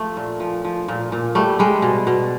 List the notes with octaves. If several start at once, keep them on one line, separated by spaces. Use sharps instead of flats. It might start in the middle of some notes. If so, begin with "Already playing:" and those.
Already playing: F3 A3
A#2
F3
F3
A#2
A#2
G3 A3
G3 G#3
B2
B2